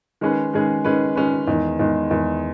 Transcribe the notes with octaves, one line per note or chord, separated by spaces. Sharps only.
D#3 G#3 C#4 G#4 B4
D#3 G#3 C#4 G#4 B4
D#3 G#3 C#4 G#4 B4
D#3 G#3 C#4 G#4 B4
E2 D#3 G#3
E2 D#3 G#3
E2 D#3 G#3